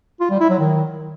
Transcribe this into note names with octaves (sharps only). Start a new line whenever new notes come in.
F4
G3
E4
F#3
D#3